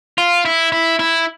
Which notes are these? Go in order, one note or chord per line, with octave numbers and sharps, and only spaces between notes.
F4
E4
E4
E4